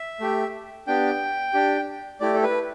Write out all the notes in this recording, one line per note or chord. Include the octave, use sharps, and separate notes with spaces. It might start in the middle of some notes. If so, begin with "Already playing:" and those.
Already playing: E5
A3 G4
B3 D4 G4 G5
D4 G4
A3 E4 G4 D5
A4
B4